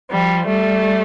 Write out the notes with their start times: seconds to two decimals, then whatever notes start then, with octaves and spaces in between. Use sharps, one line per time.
0.12 F3 G3
0.47 G3 A3